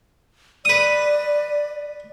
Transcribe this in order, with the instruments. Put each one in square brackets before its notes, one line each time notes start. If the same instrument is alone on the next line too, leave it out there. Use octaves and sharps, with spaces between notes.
[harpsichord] B4 D#6 [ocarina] D5